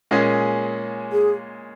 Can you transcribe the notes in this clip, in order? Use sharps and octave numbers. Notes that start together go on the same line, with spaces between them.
A#2 G#3 C#4 G#4
G#4